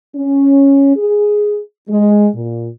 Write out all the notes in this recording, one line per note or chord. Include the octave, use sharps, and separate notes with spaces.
C#4
G#4
G#3
A#2